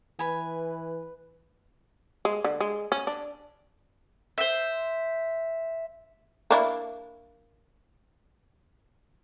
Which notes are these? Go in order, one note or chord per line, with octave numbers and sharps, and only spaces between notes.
E3 B4 G#5 B5
G#3
D3
G#3
C#4
D4
C5 E5
A#3 D4 E4